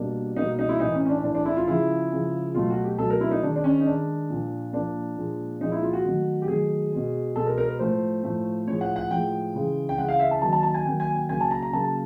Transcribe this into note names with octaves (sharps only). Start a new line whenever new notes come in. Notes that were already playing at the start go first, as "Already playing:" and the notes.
Already playing: B2 G3 A#3 D4
B2 G3 A#3 D#4
D#4
E4
A2 E3 A3 D#4
C#4
C#4
D4
A2 E3 A3 D4
D4
E4
F4
C#3 F3 G#3 E4
C#3 F3 G#3
B2 F#3 A3 F4
F#4
G4
B2 F#3 A3 A4
A#4
E4
D#4
D#3 G#3 D4
D4
C#4
D#4
D#3 G#3 D4
A#2 F3 A#3
A#2 F3 A#3 D4
A#2 F3 G#3
A#2 F3 G#3 D#4
E4
F4
F#4
D#3 F#3 A3
G4
D#3 F#3 A3 G#4
B2 G#3
B2 G#3 A4
A#4
A#4
B4
A2 F3 A3 C5
A2 F3 A3
A2 F3 G#3 C#5
F#5
F#5
A2 F3 G#3 G5
C#3 E3 G#3
G5
C#3 E3 G#3 F#5
F5
E5
A5
D#3 F#3 A#3 A5
A5
A5
G#5
D#3 F#3 A#3 G5
G#5
G5
C#3 F#3 A#3 G#5
A5
A#5
A#5
C#3 F#3 A#3 A5